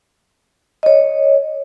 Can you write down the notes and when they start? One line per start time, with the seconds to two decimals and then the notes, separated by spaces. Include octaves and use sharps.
0.83 C#5 D#5